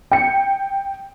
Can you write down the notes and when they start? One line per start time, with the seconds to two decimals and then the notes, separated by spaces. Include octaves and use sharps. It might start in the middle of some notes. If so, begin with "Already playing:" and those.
0.12 G5 C#7